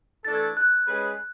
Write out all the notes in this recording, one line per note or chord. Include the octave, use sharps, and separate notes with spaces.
E3 A3 D4 A4 A6
G#6
F#6
G#3 C#4 G#4 B4